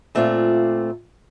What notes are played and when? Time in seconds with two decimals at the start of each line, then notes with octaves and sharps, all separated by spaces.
0.15 A#2 A3 C4 F4 D5 F5